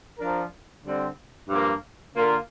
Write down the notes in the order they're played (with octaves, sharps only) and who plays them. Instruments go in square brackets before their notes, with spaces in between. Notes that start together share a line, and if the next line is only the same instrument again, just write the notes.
[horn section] F3 D4 A#4
D3 G3 C4
G2 F3 A#3
D3 A#3 F4 A#4